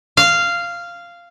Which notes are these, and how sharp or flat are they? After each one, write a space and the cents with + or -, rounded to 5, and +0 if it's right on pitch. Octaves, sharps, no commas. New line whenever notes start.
F5 -10